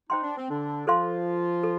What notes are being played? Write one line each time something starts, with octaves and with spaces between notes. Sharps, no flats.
D#4 C5 G5 C6
D4
C4
D3 D4
F3 F4 A4 C5 F5 C6
A4